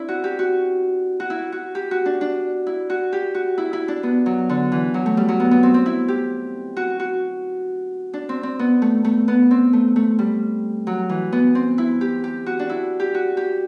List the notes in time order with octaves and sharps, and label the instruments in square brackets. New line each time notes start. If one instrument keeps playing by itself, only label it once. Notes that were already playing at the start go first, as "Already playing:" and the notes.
Already playing: [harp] C4 D4 E4
F#4
G4
F#4
F#4
E4
F#4
G4
F#4
D4
D4
E4
F#4
G4
F#4
E4
E4
D4
B3
F#3
D3
E3
F#3
A3
G3
F#3
B3
B3
C4
C4
E4
G4
F#4
F#4
D4
C4
C4
B3
A3
A3
B3
C4
A3
A3
G3
F#3
E3
B3
C4
E4
G4
G4
F#4
D4
E4
G4
F#4
G4